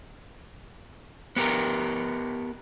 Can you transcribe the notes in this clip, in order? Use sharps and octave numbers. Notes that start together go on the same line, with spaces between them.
B3 G4 A#4